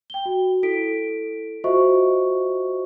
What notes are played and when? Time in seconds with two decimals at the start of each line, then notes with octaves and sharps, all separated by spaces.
0.10 G5 G7
0.25 F#4
0.63 E4 A4 B6 D7
1.64 F4 F#4 C5 D#5 E5 C#6